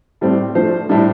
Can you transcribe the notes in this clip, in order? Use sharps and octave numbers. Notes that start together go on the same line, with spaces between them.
A2 G3 C4
F3 A3 D4 C5
A2 G3 D4